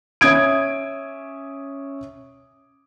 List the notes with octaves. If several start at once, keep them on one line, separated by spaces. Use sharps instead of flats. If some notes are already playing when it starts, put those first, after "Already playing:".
C#4 E5 D#6 G#6 D7